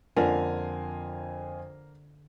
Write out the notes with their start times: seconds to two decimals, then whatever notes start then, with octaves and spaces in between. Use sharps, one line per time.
0.17 F2 D3 A#3 F4 A#4 G#5